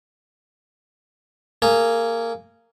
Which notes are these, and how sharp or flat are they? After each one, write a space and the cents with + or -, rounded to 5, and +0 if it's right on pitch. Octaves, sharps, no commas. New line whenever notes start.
A#3 -20 G#4 +0